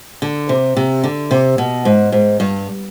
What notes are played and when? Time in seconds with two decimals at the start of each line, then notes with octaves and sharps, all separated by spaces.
0.22 D3
0.49 C3
0.77 C3
1.03 D3
1.31 C3
1.58 B2
1.85 G#2
2.12 G#2
2.40 G2